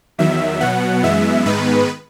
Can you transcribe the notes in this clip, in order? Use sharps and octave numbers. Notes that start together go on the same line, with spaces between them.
E2 D#3 F#3 E5
B2 F#3 B3 F#5
F#2 E3 G#3 B3 E5
G#2 D#3 G#3 B3 B4